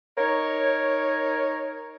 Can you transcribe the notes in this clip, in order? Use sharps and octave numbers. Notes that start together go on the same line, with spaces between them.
D#4 A#4 C#5